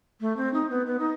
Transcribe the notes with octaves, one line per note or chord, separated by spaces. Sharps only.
A3
C4
D#4
B3
B3
D#4